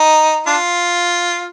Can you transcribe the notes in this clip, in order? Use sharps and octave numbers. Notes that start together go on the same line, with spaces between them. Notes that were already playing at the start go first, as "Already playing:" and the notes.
Already playing: D#4
D4 F4